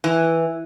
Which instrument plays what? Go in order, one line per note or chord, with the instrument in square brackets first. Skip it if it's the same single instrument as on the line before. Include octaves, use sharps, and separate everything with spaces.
[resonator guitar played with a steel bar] E3